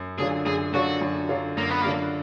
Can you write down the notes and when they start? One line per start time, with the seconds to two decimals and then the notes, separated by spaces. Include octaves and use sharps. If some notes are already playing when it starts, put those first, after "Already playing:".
Already playing: F#2
0.19 D3 F#3 D4 F4 G#4
0.46 F#2 G#4
0.73 D3 F#3 D4 F4 F#4
1.01 F#2
1.29 D3 F#3 D4 F4
1.57 F#2 A#3
1.69 B3
1.81 D3 F#3 A#3 D4 F4